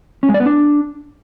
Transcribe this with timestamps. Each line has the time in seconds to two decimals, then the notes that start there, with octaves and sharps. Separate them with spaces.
0.23 C#4
0.29 G#3
0.34 D5
0.40 B3
0.46 D4